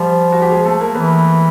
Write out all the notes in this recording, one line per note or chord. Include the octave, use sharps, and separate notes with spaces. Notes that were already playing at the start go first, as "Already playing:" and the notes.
Already playing: F3 G3 G4
F#4
G4
G#3 G#4
A3 A4
A#3 A#4
E3 B3 B4